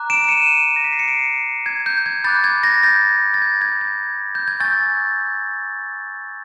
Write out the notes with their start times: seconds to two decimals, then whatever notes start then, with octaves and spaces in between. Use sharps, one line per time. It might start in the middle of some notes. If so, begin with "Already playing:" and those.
Already playing: A#5 D6 F#6
0.10 D7 E7
0.24 E7
0.28 C#7 D#7
0.76 A#6
0.84 B6
0.93 C7
0.99 C#7
1.08 C7 D7
1.66 G#6
1.86 G6
2.06 G#6
2.24 B5 D6 F#6 G6 A6
2.44 G#6
2.63 G#6 A#6
2.83 G6 A6
3.34 A6
3.42 G#6
3.61 G#6
3.81 G#6
4.35 G6
4.48 G#6
4.60 G#5 C#6 E6 G6 A6